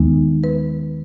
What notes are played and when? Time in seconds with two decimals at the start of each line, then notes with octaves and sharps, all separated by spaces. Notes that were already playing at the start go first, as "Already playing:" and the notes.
Already playing: D#2 D#3 G#3 B3 D#4
0.44 B4